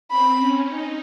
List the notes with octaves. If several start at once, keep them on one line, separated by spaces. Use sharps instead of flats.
C4 B5
C#4
D#4